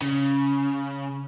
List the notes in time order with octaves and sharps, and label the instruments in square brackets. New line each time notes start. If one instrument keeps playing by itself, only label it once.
[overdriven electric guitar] C#3